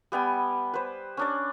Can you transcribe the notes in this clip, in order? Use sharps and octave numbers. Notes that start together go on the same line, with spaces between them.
G3 B3 G5 G#5
B4 C5
C#4 D4 D5